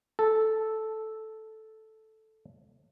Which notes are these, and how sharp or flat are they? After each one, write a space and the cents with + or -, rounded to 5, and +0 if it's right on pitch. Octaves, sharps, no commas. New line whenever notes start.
A4 -5